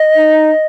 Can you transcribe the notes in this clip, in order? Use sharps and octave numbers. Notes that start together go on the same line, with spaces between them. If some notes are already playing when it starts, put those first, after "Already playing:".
Already playing: D#5
D#4